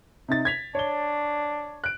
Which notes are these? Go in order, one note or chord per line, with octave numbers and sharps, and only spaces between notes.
C3 D#4 A6
G#6 B6 F7
D4 C#5 G7
F#6 D7